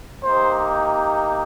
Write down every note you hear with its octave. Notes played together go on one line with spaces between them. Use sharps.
A#3 D#4 G4 C5